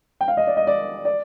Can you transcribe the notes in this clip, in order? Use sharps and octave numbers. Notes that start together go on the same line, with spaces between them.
G5
F5
D#5
D5
D#5
D5
D5